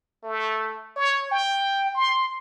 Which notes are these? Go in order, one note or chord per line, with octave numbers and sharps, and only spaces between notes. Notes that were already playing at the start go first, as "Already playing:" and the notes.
A3
C#5
G5
C6